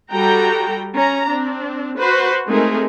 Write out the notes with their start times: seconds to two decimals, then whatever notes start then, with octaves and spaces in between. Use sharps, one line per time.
0.11 G3 F#4 A4 G5 A#5
0.95 C#4 A#5
1.26 C4 D4
1.98 F#4 B4 C5
2.48 G#3 A3 C4 D#4 G#4 A#4